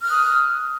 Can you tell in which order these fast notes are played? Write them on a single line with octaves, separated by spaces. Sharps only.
F6 F#6 D#6